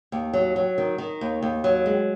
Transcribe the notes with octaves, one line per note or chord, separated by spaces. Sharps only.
D#2
F#3
F#3
D#3
D#3
D#2
D#2
F#3
G#3